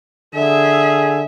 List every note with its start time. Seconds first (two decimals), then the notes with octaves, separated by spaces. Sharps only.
0.35 D3 G#4 E5